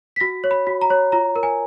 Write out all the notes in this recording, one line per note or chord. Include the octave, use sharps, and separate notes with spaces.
B6
F#4 A#6
C#5
B5
F#4
A#5
C#5
F4 A#5
A#4
G#5